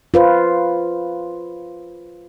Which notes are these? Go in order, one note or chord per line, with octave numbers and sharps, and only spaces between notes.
F4 B4 C5